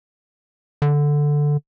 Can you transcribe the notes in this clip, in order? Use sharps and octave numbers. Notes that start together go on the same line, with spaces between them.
D3